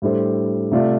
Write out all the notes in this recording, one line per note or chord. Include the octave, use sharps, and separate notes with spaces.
A2 G3 D4 A4 C5
C3 A3 F4 D5